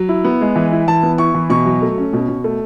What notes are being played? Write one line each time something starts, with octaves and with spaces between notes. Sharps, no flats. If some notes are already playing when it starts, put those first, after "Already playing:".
Already playing: F#3
E4
B3
G#3
E3
E4
E3 A5
B3
E4 C#6
E3
B2 C#6
F#3
A3
C#4
B2
B2
A3